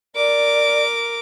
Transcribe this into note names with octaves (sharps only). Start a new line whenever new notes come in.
A#4 D5 D6